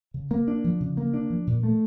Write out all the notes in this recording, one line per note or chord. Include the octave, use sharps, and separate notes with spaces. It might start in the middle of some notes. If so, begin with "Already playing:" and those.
C#3
A#3
D4
F3
C#3
A#3
D4
F3
A#2
A3